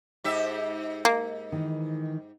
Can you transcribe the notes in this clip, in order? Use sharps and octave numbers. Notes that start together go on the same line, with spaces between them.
G#2 G4 E5
A#3
D#3 E3